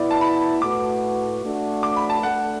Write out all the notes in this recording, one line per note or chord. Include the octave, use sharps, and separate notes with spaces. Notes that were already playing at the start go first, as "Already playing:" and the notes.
Already playing: B2 B3 E4 D5
A5
B5
A2 A3 F#4 B4 D6
A3 D4 F#4
D6
B5
A5
A3 D4 A4 F#5